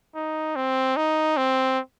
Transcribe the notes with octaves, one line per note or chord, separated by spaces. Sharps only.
D#4
C4
D#4
C4